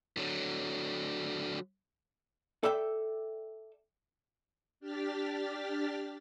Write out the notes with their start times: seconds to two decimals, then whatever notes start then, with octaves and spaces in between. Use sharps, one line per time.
0.17 D3 F#3
2.63 A4 D5 E5 G5
4.80 D4 G4 F6 A6 B6